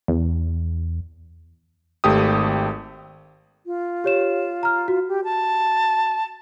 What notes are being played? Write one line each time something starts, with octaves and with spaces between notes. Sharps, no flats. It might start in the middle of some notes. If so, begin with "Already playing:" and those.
E2
G#1 A3 G4 D#6
F4
G4 C#5 E7
A#5 F6
F#4
G4
A5